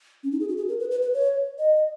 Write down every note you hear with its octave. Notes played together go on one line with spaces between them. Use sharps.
C#4
D#4
G#4
F#4
G#4
A#4
B4
B4
B4
C#5
D#5